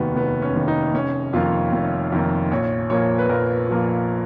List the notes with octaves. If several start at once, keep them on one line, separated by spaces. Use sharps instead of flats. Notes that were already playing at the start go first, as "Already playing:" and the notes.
Already playing: F1 D#2 D#3 B3 F#4
F1 B3
C#4
D#2 D#3
D#4
F1 C#4
F2 D#3 A#3 F4
F1
F2 D#3 A#3
A#1 C#5
A#2 F3 A#3 C#5
B4
A#1 A#4
A#2 F3 A#3